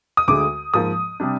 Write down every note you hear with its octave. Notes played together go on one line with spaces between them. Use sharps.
D#6
D2 D3 G#3 D6
G#2 F3 A#3 D#6
C3 G3 D4